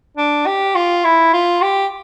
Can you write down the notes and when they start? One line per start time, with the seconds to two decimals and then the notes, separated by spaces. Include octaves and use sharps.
0.17 D4
0.46 G4
0.75 F4
1.04 E4
1.33 F4
1.62 G4